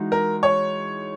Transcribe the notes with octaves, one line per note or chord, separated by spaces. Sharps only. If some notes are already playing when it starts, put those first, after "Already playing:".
Already playing: E3 G#3 D#4 F#4
A#4
C#5